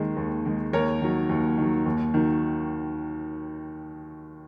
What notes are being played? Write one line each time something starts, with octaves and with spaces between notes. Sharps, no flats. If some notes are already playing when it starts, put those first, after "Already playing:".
Already playing: D#2 D#3 G#3 G#4
D#2
D#3 G#3
D#2 A#4 C#5
D#3 F#3
D#2
D#3 F#3
D#2
D#3 F#3